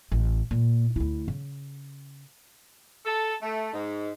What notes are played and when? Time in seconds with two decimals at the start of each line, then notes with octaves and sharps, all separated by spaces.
0.12 A1
0.51 A#2
0.96 D2 E4
1.28 C#3
3.05 A4
3.42 A3
3.73 G#2